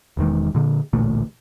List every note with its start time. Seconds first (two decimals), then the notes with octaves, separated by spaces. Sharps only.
0.17 E1 E2 D#3 G#3
0.55 A#2 D3
0.93 A1 D2 A#2 A3